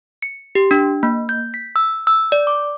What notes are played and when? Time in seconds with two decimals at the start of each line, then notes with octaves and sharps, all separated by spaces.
0.22 C#7
0.55 G4
0.71 D4
1.03 A#3
1.29 G6
1.54 B6
1.76 E6
2.07 E6
2.32 D5
2.47 D6